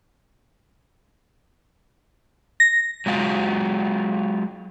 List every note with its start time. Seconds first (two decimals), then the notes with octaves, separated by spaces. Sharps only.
2.60 A#6
3.06 F#3 G#3 F4 F#4